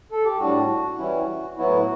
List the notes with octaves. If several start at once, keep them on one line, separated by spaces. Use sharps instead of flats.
A4
G4
A2 G3 D4 F#4
E3 G3 C#4 E4
A2 F#3 B3 E4 F#4